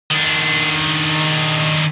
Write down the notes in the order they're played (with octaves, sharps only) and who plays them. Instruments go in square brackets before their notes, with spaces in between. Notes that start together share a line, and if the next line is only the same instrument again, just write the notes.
[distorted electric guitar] D#3 D4